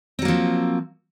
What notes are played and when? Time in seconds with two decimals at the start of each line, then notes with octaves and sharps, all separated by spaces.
0.19 C4
0.22 F#3
0.25 A#3
0.28 F3